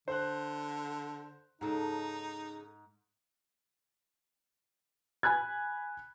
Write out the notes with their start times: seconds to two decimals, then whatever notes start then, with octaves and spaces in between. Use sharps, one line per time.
0.08 D3 C5 F#6
1.61 G#2 C#3 D#4 G#4 A4
5.23 G#5 B5 F#6 G#6